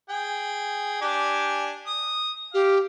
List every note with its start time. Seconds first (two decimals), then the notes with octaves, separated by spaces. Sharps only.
0.10 G#4 G5
1.01 D4 G4 G#5
1.87 D#6
2.54 G4 F5